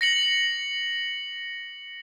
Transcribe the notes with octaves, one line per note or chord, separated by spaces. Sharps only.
A#6 C#7 F#7